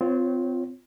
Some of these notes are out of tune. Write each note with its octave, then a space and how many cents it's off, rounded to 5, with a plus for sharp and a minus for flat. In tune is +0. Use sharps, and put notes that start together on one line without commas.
C4 -25 F4 +0 C#5 -10